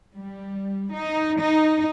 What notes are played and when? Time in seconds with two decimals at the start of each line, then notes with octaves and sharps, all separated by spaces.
0.16 G3
0.94 D#4
1.41 D#4